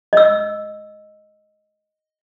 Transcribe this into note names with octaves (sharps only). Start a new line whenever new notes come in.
D#5 E6